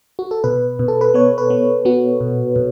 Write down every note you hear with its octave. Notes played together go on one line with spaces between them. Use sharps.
F#4
A4
B2 B4
B2
A4
B4
B3 C#5
B4
B3
B3 F#4
B2
B2